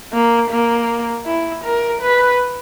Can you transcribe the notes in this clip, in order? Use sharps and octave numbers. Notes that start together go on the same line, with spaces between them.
A#3
A#3
E4
A#4
B4